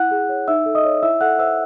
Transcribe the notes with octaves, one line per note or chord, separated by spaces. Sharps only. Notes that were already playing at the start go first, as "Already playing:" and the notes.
Already playing: E4 F#5 F#6
G#4
C#5
D#4 E5 E6
A4
D#5 D#6
C#5
E4 E5 E6
A4 F#5 F#6
C5 E5 E6